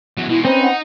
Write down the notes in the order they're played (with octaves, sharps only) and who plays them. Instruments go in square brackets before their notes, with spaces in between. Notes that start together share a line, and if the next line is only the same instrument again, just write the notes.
[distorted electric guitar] E2 F#3
[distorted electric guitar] B2 G#3 [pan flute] E4
[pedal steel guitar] C4 C#4 B4 [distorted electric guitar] D#4 [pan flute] C5
[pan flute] F#5